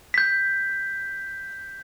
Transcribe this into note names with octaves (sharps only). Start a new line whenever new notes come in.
G6 B6